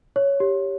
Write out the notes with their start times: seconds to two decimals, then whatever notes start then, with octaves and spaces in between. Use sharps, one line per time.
0.16 C#5
0.40 G4